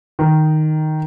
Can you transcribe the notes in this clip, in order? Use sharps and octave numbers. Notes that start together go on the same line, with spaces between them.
D#3